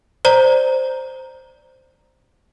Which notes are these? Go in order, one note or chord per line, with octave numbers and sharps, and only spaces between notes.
C5 D5 A#5